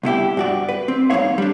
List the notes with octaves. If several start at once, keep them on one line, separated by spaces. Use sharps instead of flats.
C2 B2 E4 G4
G2 F#4 D5
B4
C4
E2 G2 A#3 D#4 C#5 F5
G3 D4